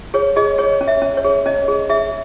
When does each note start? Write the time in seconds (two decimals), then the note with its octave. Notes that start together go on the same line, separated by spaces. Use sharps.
0.14 G#4 C#5
0.36 G#4 D#5
0.58 G#4 C#5
0.81 C#4
0.88 E5
1.02 C#4
1.17 C#5
1.25 G#4
1.46 C#4 D#5
1.68 G#4
1.90 G#4 E5